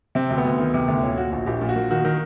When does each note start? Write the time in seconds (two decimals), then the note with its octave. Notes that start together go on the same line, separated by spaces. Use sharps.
0.15 C3 C4
0.30 D2
0.38 B3
0.45 D2
0.60 D#3
0.74 C3
0.88 D2
1.03 A#2 C#4
1.17 A#2 F#4
1.32 A#1 F#4
1.46 A#1 G4
1.61 A#2
1.69 F#4
1.76 A#2
1.90 D#3 F#4
2.05 D#3